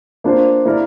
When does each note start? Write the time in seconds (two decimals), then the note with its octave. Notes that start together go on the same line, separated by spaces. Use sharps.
0.24 A#3 D4 F4 C5
0.65 A#3 E4 A#4 D5